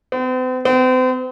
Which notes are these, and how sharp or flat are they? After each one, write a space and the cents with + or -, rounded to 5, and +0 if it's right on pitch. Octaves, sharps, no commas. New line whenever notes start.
C4 -45
C4 -40